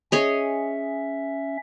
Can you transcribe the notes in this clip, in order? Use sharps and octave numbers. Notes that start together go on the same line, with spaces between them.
C#4 G#4 C#5 D#5 E5